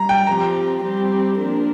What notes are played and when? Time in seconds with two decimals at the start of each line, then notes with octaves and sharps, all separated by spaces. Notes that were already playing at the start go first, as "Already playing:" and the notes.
Already playing: G3 A#5
0.09 G5
0.27 F3 C4 G4 A#5
0.82 G3 C4 G4
1.37 F3 A#3 D4 A#4